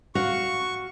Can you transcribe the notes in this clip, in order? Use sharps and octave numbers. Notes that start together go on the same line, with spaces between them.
F#4 F5 C#6